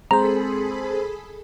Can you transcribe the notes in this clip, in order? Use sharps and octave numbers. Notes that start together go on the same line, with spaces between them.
G#3 C4 G#4 A4 C5 A#5 B5